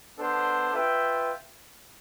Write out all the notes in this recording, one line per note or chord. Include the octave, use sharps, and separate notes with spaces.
B3 D4 A4 C5
F4 B4 E5 G5